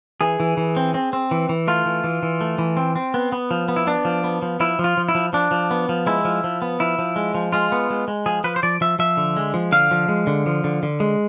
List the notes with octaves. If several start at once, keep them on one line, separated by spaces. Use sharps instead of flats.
E3 G#4
E3
E3
C4
C4
C4
E3
E3
A3 F4
E3
E3
E3
A3
E3
C4
C4
B3
B3
F3
B3
E4
B3 D4
F3
B3
F3
F3 E4
F3
F4
F3
E4
F3
F3 D4
F3
B3
F3
G#3 E4
F3
F3
B3
F3 E4
F3
G#3
F3
G#3 F4
B3
G#3
G#3
F3 G#4
F3 B4
C5
F3 D5
F3 E5
F3 E5
D3
G#3
F3
D3 F5
F3
G#3
D3
F3
D3
D3
G#3